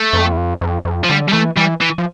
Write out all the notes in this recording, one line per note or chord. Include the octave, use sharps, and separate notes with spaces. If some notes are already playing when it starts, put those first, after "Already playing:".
Already playing: A3
F2
E2
F2
F2
F2
F3
D3 G3
G3
E3 A3
E3 G3
E3
F3